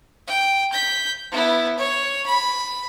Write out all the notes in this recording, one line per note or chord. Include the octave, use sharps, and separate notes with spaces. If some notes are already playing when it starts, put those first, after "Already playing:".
G5
G6 B6
B3 E4
C#5
B5